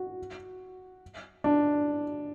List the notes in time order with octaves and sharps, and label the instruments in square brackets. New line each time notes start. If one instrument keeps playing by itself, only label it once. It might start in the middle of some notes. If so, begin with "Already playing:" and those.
Already playing: [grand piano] F#4
D4